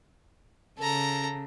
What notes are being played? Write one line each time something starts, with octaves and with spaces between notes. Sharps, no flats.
C#3 A4 A#5